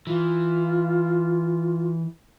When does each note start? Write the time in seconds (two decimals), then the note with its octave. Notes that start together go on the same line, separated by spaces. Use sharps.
0.07 E3 F4